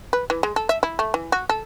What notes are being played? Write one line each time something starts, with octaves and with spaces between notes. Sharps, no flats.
B4
E3
G#3
A4
E5
E4
A3
E3
F#4
A4